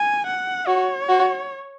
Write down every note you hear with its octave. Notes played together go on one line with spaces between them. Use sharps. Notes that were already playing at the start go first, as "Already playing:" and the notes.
Already playing: G#5
F#5
F#4 C#5
F#4